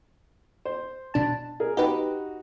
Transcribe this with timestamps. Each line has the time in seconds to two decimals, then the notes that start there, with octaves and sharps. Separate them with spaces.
0.65 C5
1.14 B2 D4 A5
1.60 G#4 A#4
1.77 D#4 F#4 G4 B4